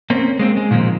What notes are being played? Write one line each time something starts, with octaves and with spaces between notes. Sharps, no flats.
A#3 C4 C#4
G#3 A#3 C4
G#3
A#2 D#3 F3 A#3 C4